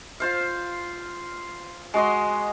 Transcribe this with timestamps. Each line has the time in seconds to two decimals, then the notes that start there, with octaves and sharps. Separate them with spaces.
0.20 F4 C5 F5
1.94 G#3 F#4 D#5 C6